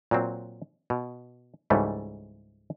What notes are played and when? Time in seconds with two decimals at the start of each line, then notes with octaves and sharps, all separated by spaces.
0.11 A#2 F#3 C4
0.90 B2
1.70 C#2 G#2 E3 G3 A3